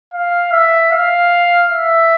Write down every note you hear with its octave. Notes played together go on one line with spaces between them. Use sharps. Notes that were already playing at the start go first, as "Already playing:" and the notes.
F5
E5
F5
E5